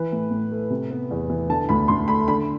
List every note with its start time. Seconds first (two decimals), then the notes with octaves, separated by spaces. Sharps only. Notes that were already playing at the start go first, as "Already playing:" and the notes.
Already playing: E3 B4
0.12 A2
0.31 A2
0.51 A3
0.70 C3
0.91 B3
1.11 E2
1.30 E3
1.50 D3 A5
1.69 D2 B5
1.88 D2 C6
2.08 A3 B5
2.28 D3 B5